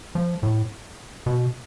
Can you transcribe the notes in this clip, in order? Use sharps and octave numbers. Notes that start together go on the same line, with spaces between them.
F3
A2
B2